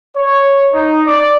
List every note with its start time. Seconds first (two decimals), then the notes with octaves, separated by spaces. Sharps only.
0.17 C#5
0.73 D#4
1.06 D5